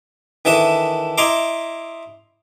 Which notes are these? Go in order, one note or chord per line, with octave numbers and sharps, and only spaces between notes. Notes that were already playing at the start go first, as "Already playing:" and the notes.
D#3 E3 D4 A4 E5 D#6
E4 D#5 A#5 C6 D6